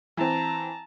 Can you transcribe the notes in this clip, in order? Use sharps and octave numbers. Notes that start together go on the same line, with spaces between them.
E3 C4 A5 A#5